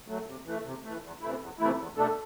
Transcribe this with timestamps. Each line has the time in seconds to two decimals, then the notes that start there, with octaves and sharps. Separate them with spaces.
0.08 F#3 A3
0.26 C3
0.46 E3 A3
0.64 C3
0.83 E3 A3
1.02 E2
1.21 C3 E3 A3 E4
1.40 E2
1.59 C3 E3 A3 E4
1.78 E2
1.97 B2 A3 D4 A4